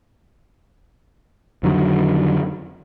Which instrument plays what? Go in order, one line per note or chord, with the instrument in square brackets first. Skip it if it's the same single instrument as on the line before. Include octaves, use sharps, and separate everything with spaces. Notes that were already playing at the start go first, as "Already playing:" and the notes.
[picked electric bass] F2 D3 D#3 F#3